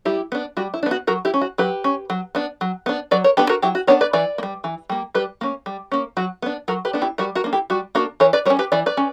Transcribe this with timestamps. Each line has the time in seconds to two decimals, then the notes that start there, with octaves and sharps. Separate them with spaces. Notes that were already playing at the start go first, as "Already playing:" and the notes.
0.05 G3 E4 G4
0.32 B3 D4
0.57 G3 F#4
0.74 E4
0.83 D4
0.86 B3 F#4
1.07 F#3 F#4 A#4
1.25 E4 G4
1.34 C#4
1.41 F#4
1.58 F#3 G4 B4
1.84 C#4
2.10 F#3
2.35 B3 D4
2.61 F#3
2.86 B3 D4
3.11 F#3 B4 D5
3.24 A#4 C#5
3.37 B3 D4 G4 B4
3.49 F#4 A#4
3.62 F#3 E4 G4
3.75 F#4
3.87 B3 D4 A#4 C#5
4.01 B4 D5
4.13 E3 B4 D5
4.38 A#3
4.43 G3
4.64 E3
4.90 G3 A#3
5.15 G3 G4 B4
5.41 A#3 C#4
5.66 G3
5.92 A#3 C#4
6.17 F#3 F#4
6.42 B3 D4
6.68 F#3 F#4 A#4
6.85 G4 B4
6.93 B3 D4
7.01 E4 G4
7.18 G3 F#4 A#4
7.35 F#4 A#4
7.44 A#3 D4
7.53 E4 G4
7.70 G3 F#4
7.95 A#3 D4 F#4 A#4
8.20 E3 A#4 C#5
8.33 B4 D5
8.45 G3 A#4 C#5
8.50 C#4
8.59 G4 B4
8.72 E3 D5
8.86 B4 D5
8.97 C#4